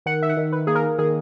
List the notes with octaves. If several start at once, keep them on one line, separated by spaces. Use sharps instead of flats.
D#3 F#5
E5
F#5
D#3
B4
A#3 G#4
A#4
D#3 G#4